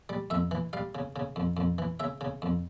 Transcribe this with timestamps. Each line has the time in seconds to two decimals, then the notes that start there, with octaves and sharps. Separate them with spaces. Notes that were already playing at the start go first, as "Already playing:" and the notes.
0.09 G3
0.30 F2 E5
0.51 E3
0.73 G3 F5
0.95 C#3
1.16 C#3
1.36 F2
1.57 F2
1.78 E3
2.00 C#3 E5
2.21 C#3
2.42 F2